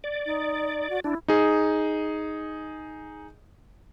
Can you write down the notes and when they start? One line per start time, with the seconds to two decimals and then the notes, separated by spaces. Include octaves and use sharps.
0.04 D5
0.26 D#4
0.90 F#4
1.04 D4 E4
1.28 D#4 G#4